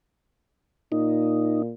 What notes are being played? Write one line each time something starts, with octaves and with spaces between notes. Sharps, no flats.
A#2 D#4